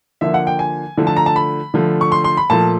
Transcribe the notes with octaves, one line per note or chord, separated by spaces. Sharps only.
D3 F3 A#3 E5
F#5
G5
G#5
D3 F3 A3
A5
A#5
A5
B5
D3 F3 A3
C#6
C6
C6
B5
A#2 F3 A3 A5